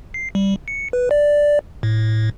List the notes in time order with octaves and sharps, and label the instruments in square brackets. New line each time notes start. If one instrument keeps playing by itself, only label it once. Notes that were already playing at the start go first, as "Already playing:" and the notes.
[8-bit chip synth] C7
G3
C#7
B4
D5
A2